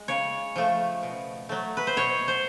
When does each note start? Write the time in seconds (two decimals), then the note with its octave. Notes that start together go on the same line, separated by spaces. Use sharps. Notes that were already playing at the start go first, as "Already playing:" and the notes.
Already playing: G#3
0.08 C#3 C#5
0.56 F3 A3
1.03 B2
1.49 F#3 A3
1.77 B4
1.87 C5
1.96 B2 C#5
2.28 C5